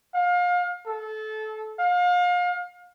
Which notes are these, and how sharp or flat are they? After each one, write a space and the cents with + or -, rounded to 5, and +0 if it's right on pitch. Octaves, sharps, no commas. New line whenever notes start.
F5 +30
A4 -25
F5 +35